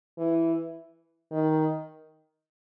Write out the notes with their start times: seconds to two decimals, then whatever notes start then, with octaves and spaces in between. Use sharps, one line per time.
0.18 E3
1.32 D#3